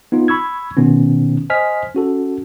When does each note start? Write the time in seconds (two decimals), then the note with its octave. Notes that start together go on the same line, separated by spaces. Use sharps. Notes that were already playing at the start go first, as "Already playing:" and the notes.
0.12 B3 D#4 F4
0.28 B5 C#6 E6 G#6
0.77 B2 D#3 B3 C#4
1.50 C5 D#5 G#5 F6 B6
1.95 C#4 F#4 A4